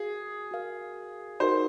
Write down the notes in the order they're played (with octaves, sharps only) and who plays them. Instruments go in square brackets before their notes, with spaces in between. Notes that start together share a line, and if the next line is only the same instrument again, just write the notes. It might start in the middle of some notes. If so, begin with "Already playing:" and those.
Already playing: [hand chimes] F#4 A#4 F5 [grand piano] G#4
[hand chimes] F#4 A#4 F5
[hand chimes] D#4 F#4 A#4 [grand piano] C5